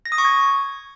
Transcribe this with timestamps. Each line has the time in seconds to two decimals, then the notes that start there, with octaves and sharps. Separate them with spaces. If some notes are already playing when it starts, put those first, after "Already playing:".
0.06 A#6
0.12 D#6
0.18 C#6
0.25 G#6